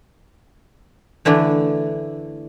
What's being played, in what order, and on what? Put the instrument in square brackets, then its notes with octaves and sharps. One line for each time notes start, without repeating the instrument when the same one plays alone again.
[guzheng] D3 E3 A3 D4